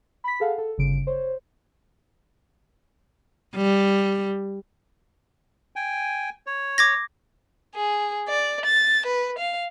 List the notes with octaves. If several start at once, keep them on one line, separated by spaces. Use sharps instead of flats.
B5 B6
G#4 A4 F5 F#5
A4
G1 C#3 D7
C5 C#5
G3
G5 G#5
C#5
D6 G#6 A#6
G#4
D5
A6
B4
F5